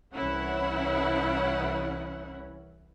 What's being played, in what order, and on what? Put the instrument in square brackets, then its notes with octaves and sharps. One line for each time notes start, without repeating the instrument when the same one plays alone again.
[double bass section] C2 E3 C#4 [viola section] E4 F#5